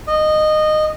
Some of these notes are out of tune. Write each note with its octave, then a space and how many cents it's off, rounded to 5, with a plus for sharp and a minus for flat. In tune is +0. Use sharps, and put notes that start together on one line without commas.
D#5 -15